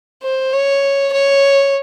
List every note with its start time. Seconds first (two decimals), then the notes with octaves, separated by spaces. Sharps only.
0.23 C5
0.53 C#5
1.12 C#5